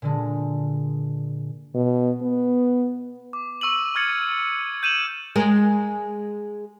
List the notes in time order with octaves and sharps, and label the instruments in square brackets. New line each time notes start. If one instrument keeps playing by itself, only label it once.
[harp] A#2 D3 G#3
[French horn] B2
B3
[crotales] D6
C#6 E6 D#7 F#7
C#6 F6 G#6 A6 C#7 F#7
G6 D#7 E7 F#7
[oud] G#3 G#4 A#4